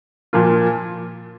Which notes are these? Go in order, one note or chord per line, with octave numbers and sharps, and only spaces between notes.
A#2 F3 A#3 F4